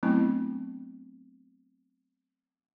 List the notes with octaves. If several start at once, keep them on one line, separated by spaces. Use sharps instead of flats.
F#3 A3 B3 C4 D4 E4